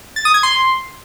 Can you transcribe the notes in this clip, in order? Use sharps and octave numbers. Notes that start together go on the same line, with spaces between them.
A6
D#6
G#6
C6